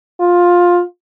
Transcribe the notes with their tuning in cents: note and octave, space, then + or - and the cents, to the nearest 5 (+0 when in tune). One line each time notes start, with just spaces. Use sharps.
F4 +15